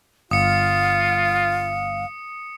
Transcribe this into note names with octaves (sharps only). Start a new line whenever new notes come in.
G1 F4 F5 D#6 C#7